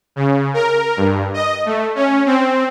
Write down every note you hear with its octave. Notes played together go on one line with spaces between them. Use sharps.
C#3
A#4
G2
D#5
A3
C#4
C4